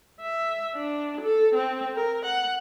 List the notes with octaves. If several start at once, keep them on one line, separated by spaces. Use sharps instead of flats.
E5
D4
A4
C4
A#4
F#5